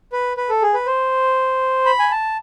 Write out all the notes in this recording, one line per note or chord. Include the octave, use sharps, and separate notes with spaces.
B4
B4
A4
G#4
B4
C5
B5
G#5
A5